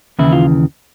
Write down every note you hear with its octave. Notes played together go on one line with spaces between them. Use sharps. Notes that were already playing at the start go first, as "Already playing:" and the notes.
D#2 C#3 E3 E4
F4